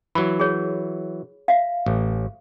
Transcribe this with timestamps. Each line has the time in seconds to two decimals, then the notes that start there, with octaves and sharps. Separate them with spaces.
0.15 E3 F#3 B5
0.40 G#4 C#5
1.48 E5 F5
1.86 A1